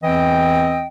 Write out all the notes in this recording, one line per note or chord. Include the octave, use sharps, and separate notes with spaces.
E2 E3 C4 D#5 G5